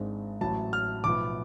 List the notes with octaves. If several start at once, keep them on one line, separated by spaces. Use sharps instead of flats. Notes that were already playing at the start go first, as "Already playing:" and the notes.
Already playing: G#1 G#2 G#3 D4
A1 A2 F#3 A5
F6
B1 A2 F3 B3 D6